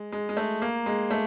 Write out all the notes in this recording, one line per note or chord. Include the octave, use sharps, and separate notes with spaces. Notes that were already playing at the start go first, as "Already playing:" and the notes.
Already playing: G#3
G#3
G#3
A3
A#3
G#3
A3